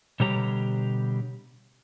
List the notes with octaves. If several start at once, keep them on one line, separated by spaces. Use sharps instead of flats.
B2 D3 G3 G4 C#5 A#5